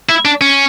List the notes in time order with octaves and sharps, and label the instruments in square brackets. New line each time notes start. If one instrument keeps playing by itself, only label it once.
[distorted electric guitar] E4
D4
C#4